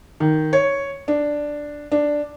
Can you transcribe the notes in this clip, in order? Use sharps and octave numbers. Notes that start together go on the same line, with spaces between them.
D#3
C#5
D4
D4